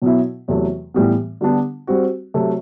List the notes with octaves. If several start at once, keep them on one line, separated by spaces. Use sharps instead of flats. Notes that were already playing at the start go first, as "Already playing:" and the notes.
B2 F#3 B3 E4
E2 C3 F#3 A3
A2 E3 G3 B3
D3 G3 B3 D4
G3 C4 F#4
C3 F#3 A3